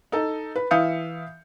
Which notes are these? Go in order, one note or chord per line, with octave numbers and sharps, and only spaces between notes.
D#4 A4
B4
E3 E5 F5 D#6 G6 C#7